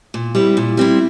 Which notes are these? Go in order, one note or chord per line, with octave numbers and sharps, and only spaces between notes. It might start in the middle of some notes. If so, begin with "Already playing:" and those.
A#2
G3 C4 E4
A#2
G3 C4 E4